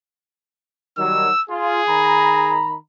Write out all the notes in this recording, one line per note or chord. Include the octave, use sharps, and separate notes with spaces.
D#3 F#3 G3 E6
F4 G#4
D#3 A#5 B5